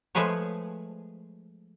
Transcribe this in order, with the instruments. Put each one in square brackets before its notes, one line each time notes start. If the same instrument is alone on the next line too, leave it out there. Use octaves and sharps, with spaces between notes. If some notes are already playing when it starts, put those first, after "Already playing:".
[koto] F3 G#3 A3 G#4 B4 C#5